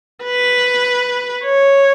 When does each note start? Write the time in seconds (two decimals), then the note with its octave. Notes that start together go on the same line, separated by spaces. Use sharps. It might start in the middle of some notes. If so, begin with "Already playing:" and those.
0.24 B4
1.45 C#5